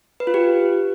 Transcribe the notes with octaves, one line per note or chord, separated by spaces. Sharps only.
B4
F4
G4